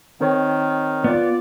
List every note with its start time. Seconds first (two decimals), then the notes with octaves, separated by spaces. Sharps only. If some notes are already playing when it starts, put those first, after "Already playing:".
0.21 D#3 C4 A#4 C#5
1.04 B3 F4 D5